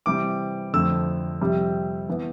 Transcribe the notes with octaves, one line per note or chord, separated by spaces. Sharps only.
C3 E3 G3 C4 D6
F2 D3 A3 C4 E6
F2 C3 G3 C4
E3 B3